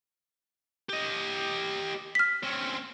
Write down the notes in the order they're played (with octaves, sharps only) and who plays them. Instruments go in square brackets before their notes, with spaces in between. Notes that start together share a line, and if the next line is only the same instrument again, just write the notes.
[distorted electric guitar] G4 D#5
[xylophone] F6 B6
[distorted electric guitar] C4 C#4